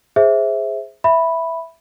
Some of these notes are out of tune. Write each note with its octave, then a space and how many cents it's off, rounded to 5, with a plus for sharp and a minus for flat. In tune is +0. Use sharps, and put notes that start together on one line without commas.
G#4 +0 C5 +5 E5 -5
E5 +0 B5 +0